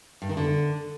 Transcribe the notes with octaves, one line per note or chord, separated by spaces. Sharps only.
G2
D#3
D3